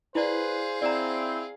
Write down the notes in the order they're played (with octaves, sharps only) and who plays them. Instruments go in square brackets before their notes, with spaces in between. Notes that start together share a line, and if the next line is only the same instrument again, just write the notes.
[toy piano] E4 D5 [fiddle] G#4 F5 [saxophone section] B4 [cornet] C5
[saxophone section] C4 [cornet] E4 [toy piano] D5 A#5